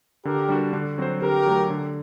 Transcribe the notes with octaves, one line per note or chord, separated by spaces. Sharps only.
D3 G4 A#4
G3 D4 F#4
D3
F#3 C4 F#4 C5
D3 G4 A#4
F#3 A3
D3